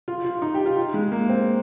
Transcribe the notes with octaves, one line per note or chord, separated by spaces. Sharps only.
F4
F4
D#4
G4
F4
F4
G#3
A#3
C4